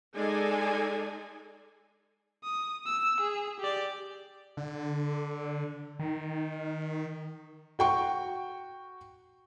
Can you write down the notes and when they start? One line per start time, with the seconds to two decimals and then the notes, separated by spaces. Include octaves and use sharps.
0.15 G#3 D#4 G#4 A4 D5 G#5
2.44 D#6
2.86 E6
3.21 G#4
3.60 G4 D5
4.57 D3
5.99 D#3
7.79 F#4 G5 C#6